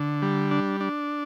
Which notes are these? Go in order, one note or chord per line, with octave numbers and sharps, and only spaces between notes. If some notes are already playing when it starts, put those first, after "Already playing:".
Already playing: D3
G3
D4
D4